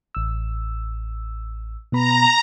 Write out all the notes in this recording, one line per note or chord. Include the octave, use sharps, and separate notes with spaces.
A1 E6
B2 B3 A#5 B5